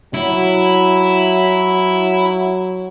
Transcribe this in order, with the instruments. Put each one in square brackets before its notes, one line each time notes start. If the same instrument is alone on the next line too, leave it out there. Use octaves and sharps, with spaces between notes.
[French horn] F#3 [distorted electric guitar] E4